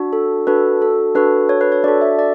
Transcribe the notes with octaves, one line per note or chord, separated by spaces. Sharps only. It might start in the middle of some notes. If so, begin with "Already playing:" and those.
Already playing: D4 F#4
A4
D4 F#4 A4 B4
A4
D4 F#4 A4 B4
C#5
B4
C#5
D4 F#4 A4 D5
E5
D5